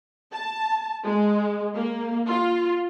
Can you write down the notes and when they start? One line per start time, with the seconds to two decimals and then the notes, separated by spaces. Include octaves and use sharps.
0.32 A5
1.04 G#3
1.75 A#3
2.28 F4